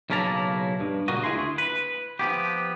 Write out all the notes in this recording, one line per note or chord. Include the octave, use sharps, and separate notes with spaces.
B1 C#3 A#3 E4 A5 A#5
G2
C#2 A#2 A#3 F#4 D#5
D2 E4 G#4 C6
B4
F3 B3 G4